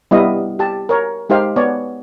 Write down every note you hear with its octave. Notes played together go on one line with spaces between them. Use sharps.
G3 B3 E4 D#5 F5
G4 A5
A#4 C#5
G#3 D#4 G4 C5 F5
B3 C#5 D5